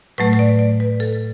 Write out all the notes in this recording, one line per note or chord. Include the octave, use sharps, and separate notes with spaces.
A2 F#3 A3 B4
B4
D5
D5
B4
A4